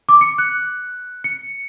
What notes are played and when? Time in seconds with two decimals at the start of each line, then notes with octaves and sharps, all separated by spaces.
0.09 D6
0.21 C#7
0.38 F#6
1.24 C#7